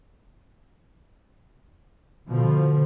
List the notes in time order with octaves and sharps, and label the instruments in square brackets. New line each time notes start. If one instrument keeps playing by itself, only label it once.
[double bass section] B2 F3 [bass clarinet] D3